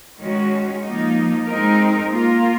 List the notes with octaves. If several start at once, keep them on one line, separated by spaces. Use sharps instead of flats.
D#3 G#3 C#4 F#4
F3 A#3 D#4
G#3 C4 D#4 A#4
A#3 F4 A#4